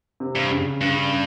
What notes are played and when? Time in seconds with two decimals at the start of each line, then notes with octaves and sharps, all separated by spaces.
0.20 C3
0.35 G2
0.51 C#3
0.81 G2 C#3